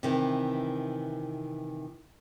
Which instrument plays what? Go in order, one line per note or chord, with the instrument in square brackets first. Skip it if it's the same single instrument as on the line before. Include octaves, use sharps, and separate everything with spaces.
[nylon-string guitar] C3 D#3 E3